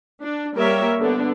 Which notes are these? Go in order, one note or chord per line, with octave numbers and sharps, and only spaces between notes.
D4
G3 A#3 G4 A#4 C#5 E5
D3 B3 D4